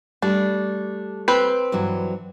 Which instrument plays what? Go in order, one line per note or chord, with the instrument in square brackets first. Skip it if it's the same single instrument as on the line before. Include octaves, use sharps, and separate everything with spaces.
[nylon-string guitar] G3 A3 [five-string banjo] D4
[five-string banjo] C4 B4
[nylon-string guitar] G2 E3 F#3